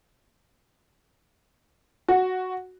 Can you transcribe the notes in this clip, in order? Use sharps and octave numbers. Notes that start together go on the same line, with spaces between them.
F#4